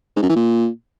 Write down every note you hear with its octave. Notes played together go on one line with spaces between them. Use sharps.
G#2
F#2
E3
A#2